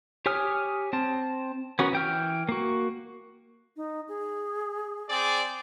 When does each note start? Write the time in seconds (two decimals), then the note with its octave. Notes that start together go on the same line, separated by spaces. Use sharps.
0.26 G4 C#5 G#5 D#6 F6
0.93 C4 A5
1.79 B3 C#4 F#4 A#4
1.93 E3 G5 F6
2.49 A#3 F#4
3.76 D#4
4.08 G#4
5.10 C4 G#4 D5